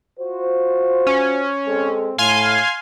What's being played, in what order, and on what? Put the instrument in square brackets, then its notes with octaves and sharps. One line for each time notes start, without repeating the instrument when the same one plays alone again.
[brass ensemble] F4 F#4 C5
[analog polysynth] C#4
[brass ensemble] G#3 C4 A4
[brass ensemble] A2 [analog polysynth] F5 G#5 C6